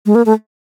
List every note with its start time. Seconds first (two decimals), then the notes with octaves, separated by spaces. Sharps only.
0.06 G#3
0.15 A#3
0.26 A3